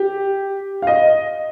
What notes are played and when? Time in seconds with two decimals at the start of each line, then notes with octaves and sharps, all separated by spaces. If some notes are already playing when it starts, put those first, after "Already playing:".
Already playing: G4
0.82 F5
0.87 D#5